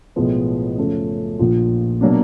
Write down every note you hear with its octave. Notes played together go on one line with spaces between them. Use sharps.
B1 A2 F3 G#3 B3
F#2 C#3 F3 A3
A#1 A#2 F3
B2 F#3 A#3 D4